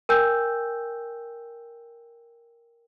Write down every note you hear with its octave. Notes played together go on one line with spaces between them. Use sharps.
A#4 G5 G#5 E6 G6